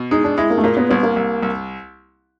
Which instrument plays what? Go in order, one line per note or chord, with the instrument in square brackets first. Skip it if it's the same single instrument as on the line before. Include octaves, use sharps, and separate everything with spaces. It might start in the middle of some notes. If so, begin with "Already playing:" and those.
Already playing: [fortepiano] B2
[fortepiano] G#3 [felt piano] D#4
[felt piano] D4
[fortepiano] G#3 [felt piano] E4
[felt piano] A#3
A3
[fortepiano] A#2 [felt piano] A#3
[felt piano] B3
[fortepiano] C2 [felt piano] B3
[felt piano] A#3
[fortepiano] C2
C2